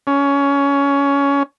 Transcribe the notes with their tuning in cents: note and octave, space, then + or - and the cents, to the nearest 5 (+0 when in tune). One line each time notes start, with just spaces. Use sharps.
C#4 +15